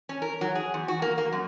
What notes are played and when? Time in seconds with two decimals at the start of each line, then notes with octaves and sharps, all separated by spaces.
0.09 C#4
0.22 A#4
0.41 F#3
0.55 G#4
0.74 E2
0.88 F#4
1.02 A#3
1.18 A#3
1.33 F#2